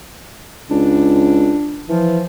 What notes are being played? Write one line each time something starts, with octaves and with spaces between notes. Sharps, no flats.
C#2 D4
E3 F3